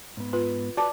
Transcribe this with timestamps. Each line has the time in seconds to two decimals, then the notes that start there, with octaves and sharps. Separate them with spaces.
0.17 G#2 B3
0.33 F4 B4
0.77 F#4 A#4 B4 D5 A5 D6